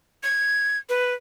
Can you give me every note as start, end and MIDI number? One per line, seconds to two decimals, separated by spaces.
0.23 0.78 92
0.89 1.14 71